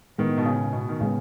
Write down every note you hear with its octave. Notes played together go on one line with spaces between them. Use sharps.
A2 D#3 G#3 B3
B2
C#3
B2
D#3
A2 C#3 G#3 B3